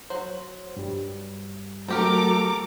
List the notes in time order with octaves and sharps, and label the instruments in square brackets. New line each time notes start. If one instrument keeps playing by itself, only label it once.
[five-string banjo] F#3 [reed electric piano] C5
[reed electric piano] G2 G3
[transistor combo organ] F#3 A3 [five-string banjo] C4 G4 A#4 [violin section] A4 A#5 D6